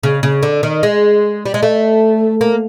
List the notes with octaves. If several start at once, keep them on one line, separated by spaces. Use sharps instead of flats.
C#3
C#3
D3
D#3
G#3
G3
G#3
A3
A#3